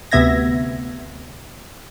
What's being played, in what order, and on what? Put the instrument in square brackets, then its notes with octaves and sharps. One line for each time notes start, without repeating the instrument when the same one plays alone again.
[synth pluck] D2 C3 B3 E5 G#6 A#6